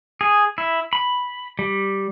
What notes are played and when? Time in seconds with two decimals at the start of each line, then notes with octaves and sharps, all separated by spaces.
0.21 G#4
0.58 E4
0.93 B5
1.59 G3